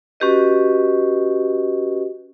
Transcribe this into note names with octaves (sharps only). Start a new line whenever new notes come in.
C#4 F#4 G4 B4 D#5